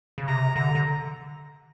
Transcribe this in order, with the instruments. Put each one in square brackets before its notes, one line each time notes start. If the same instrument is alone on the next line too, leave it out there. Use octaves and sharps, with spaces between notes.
[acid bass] C#3
[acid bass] C3 [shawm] A#5
[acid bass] D3 [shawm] A#5
[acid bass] D3